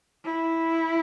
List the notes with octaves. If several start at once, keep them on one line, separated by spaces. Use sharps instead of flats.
E4